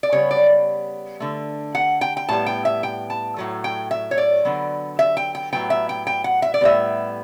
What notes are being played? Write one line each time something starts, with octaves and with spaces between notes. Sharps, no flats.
D5
C#3 G3 B3 C#5
D5
D3 A3
F#5
G5
G5
A2 G3 B3 A5
G5
E5
G5
A5
A2 F#3 A3
G5
E5
C#5
D5
D3 F#3 B3
E5
G5
G5
A2 F#3 B3 G5
E5
G5
G5
F#5
E5
D5
A2 G3 B3 E5